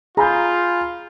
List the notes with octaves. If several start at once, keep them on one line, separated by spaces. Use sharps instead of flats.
F4 G#4 G#5 A#5 B5 G6